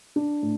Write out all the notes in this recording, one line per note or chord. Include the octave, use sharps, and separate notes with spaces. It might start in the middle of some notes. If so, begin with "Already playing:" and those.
D4
A2